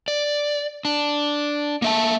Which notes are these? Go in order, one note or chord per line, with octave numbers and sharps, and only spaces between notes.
D5
D4
A#3 E5 A5